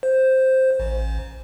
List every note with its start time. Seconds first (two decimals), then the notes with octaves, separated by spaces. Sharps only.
0.03 C5
0.80 A1